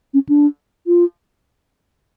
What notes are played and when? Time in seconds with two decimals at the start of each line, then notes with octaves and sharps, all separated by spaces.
0.14 C#4
0.29 D4
0.87 F4